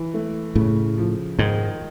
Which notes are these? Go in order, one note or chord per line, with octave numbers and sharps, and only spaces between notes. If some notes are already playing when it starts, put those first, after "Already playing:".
Already playing: E3
A3
A2 C#3
F3
G#2 D#3